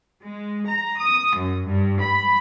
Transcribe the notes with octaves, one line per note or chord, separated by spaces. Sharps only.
G#3
A#5
D#6
F#2
G2
B5